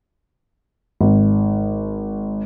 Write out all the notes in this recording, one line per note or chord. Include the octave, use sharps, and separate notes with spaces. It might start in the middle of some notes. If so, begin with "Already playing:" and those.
G#1